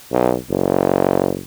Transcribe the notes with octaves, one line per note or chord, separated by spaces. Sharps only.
B1
F#1